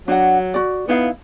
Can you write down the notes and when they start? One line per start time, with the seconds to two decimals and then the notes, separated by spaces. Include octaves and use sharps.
0.08 F#3 D4 F#5
0.54 F#4 D5
0.89 B3 D#4 E4 F5